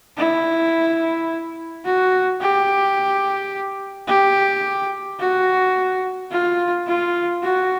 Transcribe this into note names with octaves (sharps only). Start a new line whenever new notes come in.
E4
F#4
G4
G4
F#4
F4
F4
F#4